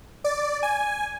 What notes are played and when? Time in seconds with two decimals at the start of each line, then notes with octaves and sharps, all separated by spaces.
0.24 D5
0.63 G#5